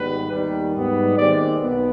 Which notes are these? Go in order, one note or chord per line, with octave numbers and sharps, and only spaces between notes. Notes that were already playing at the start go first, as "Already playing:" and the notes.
Already playing: G#1 G#2 G3 B3 B4
D#2 D#3 G3
G#2 G3 B3
D#2 D#3 G#3 C4 D5
B1 B2 B3